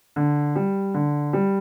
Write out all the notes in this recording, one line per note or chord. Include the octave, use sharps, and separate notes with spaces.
D3
G3
D3
G3